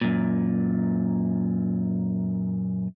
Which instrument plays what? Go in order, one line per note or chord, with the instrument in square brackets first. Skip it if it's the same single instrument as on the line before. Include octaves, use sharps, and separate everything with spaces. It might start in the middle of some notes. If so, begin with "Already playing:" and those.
[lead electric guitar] F#2 A#2